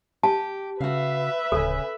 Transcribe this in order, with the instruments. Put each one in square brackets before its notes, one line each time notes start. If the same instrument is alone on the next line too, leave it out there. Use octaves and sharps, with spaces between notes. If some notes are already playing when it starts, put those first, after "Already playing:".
[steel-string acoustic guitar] G4 [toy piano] A5
[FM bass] C#3 [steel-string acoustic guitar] F#4 F5 [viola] B4 E5
[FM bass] D1 [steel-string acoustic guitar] C#3 G#5 [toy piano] A4